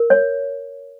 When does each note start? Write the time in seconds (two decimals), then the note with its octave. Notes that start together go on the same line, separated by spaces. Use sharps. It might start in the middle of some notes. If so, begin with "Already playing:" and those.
Already playing: A#4
0.10 C#5